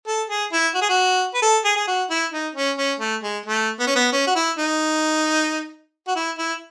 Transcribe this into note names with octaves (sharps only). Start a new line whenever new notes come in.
A4
G#4
E4
F#4
G#4
F#4
B4
A4
G#4
G#4
F#4
E4
D#4
C#4
C#4
A3
G#3
A3
B3
C#4
B3
C#4
F#4
E4
D#4
F#4
E4
E4